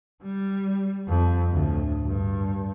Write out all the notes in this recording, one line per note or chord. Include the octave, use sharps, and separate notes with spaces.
G3
F2
D2 A2
G2